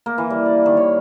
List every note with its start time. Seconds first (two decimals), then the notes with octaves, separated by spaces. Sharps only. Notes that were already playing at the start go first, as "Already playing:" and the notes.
0.06 A#3
0.18 E3
0.30 G3
0.45 D5
0.66 D#3
0.77 C#5